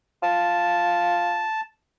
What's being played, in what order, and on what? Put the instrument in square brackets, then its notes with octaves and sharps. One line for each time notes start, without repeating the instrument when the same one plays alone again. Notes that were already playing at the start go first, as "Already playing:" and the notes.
[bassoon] F4 [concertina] A5